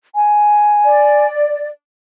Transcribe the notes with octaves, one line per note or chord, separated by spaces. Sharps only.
G#5
D5